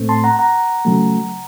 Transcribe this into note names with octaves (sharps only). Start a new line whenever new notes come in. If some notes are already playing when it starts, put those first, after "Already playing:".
Already playing: A2 A3 C4
A5 C6
F#5 A#5
F#5 A#5
C#3 F#3 A3